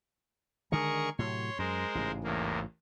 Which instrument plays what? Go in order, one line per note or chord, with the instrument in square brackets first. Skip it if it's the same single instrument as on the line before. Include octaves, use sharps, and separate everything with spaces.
[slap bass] D3 D#3 G#3 [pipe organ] G#4 A#4 C#6
[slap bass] A2 C3 F#3 [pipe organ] C#5 C6
[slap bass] F#2 [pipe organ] G#3 A#4 C5
[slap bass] A1 G#2 C#3
[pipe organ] E2 A2 A#3